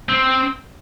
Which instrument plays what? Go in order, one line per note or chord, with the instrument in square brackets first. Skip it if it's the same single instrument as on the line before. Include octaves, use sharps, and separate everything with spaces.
[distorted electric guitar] C4